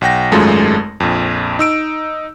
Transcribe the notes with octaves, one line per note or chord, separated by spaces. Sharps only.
B1 F#5 G5 A#6
G#1 F#2 G#3 A3 F4 A5
A#1 F2
D#4 E6 D7